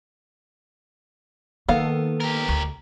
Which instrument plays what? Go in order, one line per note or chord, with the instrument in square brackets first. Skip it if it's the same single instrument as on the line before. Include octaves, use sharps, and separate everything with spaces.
[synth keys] D#3 A4 [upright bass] A#3 [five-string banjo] B3 F5
[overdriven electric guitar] G4 A#4
[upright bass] D2